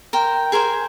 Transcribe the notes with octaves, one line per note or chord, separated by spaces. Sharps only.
A#4 C5 G5
G#4 A#4 C5 G#5